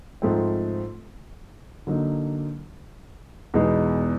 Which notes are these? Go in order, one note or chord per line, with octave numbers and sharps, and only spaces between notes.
G#2 F3 A3 C4
D3 F#3 A#3 D#4
E2 B2 G#3 B3 D#4